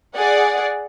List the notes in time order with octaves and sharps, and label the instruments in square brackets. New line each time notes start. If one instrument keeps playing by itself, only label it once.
[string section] G#4 D5 F#5